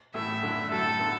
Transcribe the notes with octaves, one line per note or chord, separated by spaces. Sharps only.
A1 A2 E3 A3 E4 E5
F#2 D3 A3 E4
A2 F#3 A3 A4
D3 B3